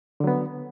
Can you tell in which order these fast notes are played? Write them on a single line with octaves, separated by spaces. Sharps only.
D3 F#3 B3